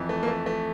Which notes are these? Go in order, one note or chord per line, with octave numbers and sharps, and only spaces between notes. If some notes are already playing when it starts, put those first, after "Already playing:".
Already playing: F2 E3
A3
A#3
A3
A3